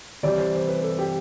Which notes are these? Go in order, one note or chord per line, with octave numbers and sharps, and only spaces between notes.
C3 E3 G3 D5
C5
C5
B4
A4
G4